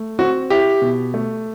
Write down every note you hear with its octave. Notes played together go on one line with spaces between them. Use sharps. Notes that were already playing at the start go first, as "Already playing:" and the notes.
Already playing: A3
C4 F#4
E4 G4
B2
A3